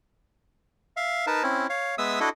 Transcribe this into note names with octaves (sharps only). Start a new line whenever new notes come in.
E5 F5
D#4 A#4 B4 A5
C4 C#4 E4
C#5 F5
G#3 B3 E5 D#6 E6
D4 E4 F#4 A4 D#5